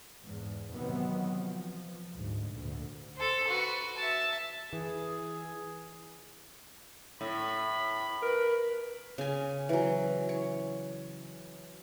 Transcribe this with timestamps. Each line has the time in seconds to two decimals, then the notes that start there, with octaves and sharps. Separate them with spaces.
0.21 E2 G#2
0.73 C3 D#3 E3 F#3 B3 C4
1.37 F3
2.15 D2 G#2
2.49 D2 A#2
3.17 A4 C5
3.48 F#4 B4
3.97 E5 A5
4.73 E3 G#4
7.21 A2 B5
8.22 A#4 B4
9.18 C#3 G#5
9.69 E3 F#3
10.29 C#5